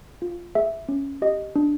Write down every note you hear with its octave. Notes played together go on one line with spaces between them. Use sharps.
F4
G#4 E5
C#4
G4 D#5
D4